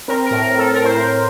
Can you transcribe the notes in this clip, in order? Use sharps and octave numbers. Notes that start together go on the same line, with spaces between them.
C4 A#4
A#4
A2
A#4
A2
A4
C4 A#4
C5
A2 A#4